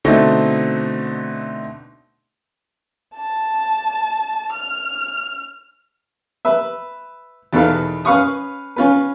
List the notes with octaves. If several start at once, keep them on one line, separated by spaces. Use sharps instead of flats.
B2 D3 A3 C4 D#4 C#6
A5
F6
B4 E5
E2 B2 D#3 A4 B4 F5
C#4 B4 F5 C#6 D#6
C#4 F4 B4